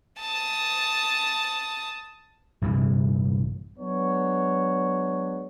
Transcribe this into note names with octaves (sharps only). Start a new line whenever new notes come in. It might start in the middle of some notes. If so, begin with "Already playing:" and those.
A5 D#6
A#1 G2 C3 E3
F#3 G#3 B3 D4 C#5